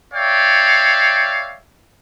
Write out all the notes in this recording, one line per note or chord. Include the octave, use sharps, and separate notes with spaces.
C#5 D5 E5 F5 G5